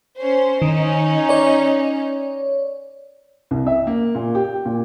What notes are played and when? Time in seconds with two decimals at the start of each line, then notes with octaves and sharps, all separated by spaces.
0.18 C#4 C5
0.62 D#3 C#4 D#4
1.29 C#5 D5
3.51 C2
3.67 E5
3.87 A#3
4.15 A#2
4.35 G4
4.65 A#2